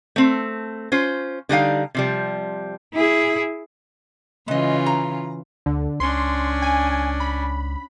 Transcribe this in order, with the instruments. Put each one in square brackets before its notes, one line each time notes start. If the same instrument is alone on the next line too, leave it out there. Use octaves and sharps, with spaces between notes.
[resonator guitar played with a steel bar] A3 C4
C#4 F4 C5
D3 G3 D#4 F5
C3 F3 G3
[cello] E4 G#4
[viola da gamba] C#3 E3 F4 [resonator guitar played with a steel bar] G#3 D#5
[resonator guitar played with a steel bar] A#5
[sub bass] D2 [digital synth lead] D3
[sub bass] C#2 [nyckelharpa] C#4 D4 [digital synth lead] C6
[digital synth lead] G#5
B5